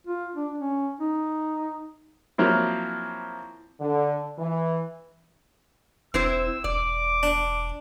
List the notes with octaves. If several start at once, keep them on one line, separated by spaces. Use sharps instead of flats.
F4
D4
C#4
D#4
F3 F#3 A#3 C4 E4
D3
E3
E1 C4 E4 C5 E6
E1 D5 D6
D4